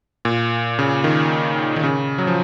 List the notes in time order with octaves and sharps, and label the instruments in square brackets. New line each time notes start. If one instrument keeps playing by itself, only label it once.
[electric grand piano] A#2
C#3
D#3
D#3
C#3
F#3
F3